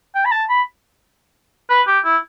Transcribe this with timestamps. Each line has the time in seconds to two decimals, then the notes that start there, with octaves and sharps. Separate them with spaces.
0.15 G5
0.25 B5
0.31 A5
0.49 B5
1.70 B4
1.87 G4
2.05 E4